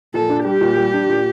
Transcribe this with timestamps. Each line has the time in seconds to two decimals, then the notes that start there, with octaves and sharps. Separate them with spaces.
0.14 A#2 A4
0.30 D4
0.45 G3 G4
0.61 A#2
0.77 G3
0.94 D4
1.09 A#2